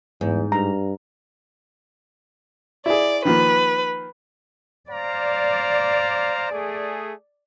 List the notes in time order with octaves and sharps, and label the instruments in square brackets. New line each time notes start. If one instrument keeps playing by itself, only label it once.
[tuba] E2 [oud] G#2
[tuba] G2 [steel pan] A#5
[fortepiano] E4 G#4 [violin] D5
[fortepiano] D#3 F3 A#3 [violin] B4
[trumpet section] C5 F5 A#5 [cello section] D5
[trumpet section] A3 G#4